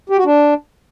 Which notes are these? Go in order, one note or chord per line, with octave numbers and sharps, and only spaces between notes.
G4
F#4
D4